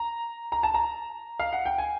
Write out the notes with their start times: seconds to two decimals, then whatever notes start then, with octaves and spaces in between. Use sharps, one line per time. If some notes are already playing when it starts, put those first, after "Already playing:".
Already playing: A#5
0.52 A#5
0.63 A5
0.75 A#5
1.40 F5
1.53 F#5
1.66 G5
1.78 G#5